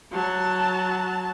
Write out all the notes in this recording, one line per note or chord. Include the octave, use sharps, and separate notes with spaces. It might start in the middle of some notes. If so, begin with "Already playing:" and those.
F#3 A5